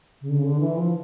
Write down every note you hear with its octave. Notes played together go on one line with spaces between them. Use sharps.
C#3
D3
C#3
D3
E3
F3